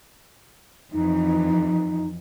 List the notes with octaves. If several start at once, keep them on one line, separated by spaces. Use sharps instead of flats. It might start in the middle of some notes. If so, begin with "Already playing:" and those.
F2 E3 D#4